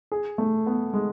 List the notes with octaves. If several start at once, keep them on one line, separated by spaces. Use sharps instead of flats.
G#4
A3
B3
G#3